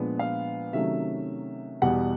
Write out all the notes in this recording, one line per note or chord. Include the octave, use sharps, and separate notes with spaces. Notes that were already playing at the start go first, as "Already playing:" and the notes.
Already playing: A#2 F3 G#3 B3 D4
F5
C3 D#3 F#3 A3 C#4 E5
E2 B2 G3 F#5